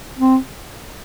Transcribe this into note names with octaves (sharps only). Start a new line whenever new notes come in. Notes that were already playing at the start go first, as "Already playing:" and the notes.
C4